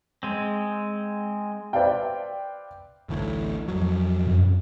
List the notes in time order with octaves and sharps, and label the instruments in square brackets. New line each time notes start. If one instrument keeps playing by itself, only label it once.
[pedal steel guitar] G#3 C4
[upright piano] B4 C5 D5 E5 F5 G5
[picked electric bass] A1 D2 A2
F2 F#3
[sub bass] F#2